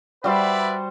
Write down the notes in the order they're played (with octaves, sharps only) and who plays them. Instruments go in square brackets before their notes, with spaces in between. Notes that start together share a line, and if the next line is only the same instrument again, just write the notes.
[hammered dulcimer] G3 F#4 C5 [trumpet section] B4 D5 E5